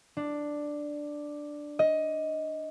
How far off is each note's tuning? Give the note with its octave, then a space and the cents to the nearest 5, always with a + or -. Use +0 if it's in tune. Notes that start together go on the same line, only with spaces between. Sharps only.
D4 +5
D#5 +15